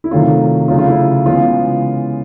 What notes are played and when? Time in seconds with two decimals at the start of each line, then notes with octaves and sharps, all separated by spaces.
0.04 E4
0.11 C3 D#3 F#3 A3 F4
0.68 C#3 F#3 A3 F4
0.78 F4
0.88 E4
1.26 C#3 E3 G#3 B3 F4